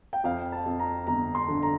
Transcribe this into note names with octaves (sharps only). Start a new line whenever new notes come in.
G5
F2 F5
A5
F2
A#5
G1 A#5
C6
D3
A#5